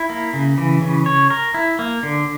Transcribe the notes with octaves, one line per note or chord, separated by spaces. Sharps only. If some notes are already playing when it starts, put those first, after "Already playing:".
Already playing: E4
A#3
C#3
E3
C#3
C#5
A#4
E4
A#3
D3